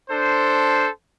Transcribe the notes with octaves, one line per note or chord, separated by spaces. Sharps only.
D4 A4 C5